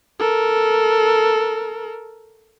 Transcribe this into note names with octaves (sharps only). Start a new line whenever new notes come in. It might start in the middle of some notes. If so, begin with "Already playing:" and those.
A4 A#4